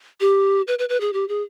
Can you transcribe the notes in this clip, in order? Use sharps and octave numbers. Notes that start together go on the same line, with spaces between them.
G4
B4
B4
B4
G#4
G4
G#4